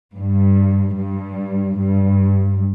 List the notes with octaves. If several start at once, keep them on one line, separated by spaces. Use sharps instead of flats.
G2
G2
G2